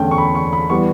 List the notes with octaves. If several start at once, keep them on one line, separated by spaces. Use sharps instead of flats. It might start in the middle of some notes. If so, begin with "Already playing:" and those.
Already playing: E2 D3 A3 C#4 G5
C#6
B5
C#6
B5
E3 G3 B3 C#6